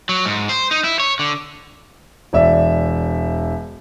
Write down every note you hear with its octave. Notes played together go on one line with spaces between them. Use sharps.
F#3
G#2
C5
D#4
E4
C#5
D3
E1 D5 E5